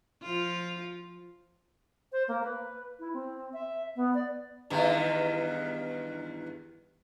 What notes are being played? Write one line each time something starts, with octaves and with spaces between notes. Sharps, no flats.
F3 F4
C5
A#3
B4
E4
C4
E5
B3
D5
E2 G2 D#3